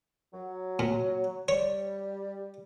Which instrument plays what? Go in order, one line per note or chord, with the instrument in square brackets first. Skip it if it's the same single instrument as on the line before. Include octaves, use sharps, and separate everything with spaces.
[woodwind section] F#3
[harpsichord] A#2
[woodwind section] G3 [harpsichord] C#5